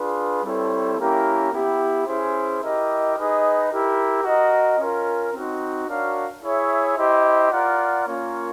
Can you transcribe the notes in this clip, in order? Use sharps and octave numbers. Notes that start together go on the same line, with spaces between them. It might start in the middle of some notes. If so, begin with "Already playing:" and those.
Already playing: D4 F4 G#4 B4
G3 C4 E4 A4 C#5
A#3 C#4 E4 G4 A#4
B3 E4 G4
C#4 E4 G#4 C5
E4 G4 A#4 D#5
D#4 G#4 B4 D#5
E4 G4 A#4
F#4 A#4 D#5
C#4 F4 A#4
C4 D#4 F#4
D4 F#4 A#4 C#5 F5
E4 G#4 C#5 E5
E4 G4 C5 D#5
F4 A#4 D5 F#5
A#3 C#4 F4 A#4 C#5